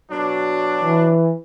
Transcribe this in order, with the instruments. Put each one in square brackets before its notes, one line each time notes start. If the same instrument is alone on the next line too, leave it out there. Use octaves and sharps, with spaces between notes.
[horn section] B2 F#3 D4
[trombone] E3